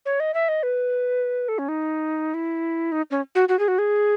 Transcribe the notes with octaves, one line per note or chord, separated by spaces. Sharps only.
C#5
D#5
E5
D#5
B4
A4
C#4
D#4
E4
D#4
C#4
F#4
F#4
G#4
F#4
G#4